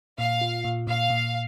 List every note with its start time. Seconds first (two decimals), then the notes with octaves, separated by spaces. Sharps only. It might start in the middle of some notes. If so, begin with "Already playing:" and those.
0.18 A#2 F5
0.41 F4
0.64 A#2
0.87 A#2 F5
1.10 A#2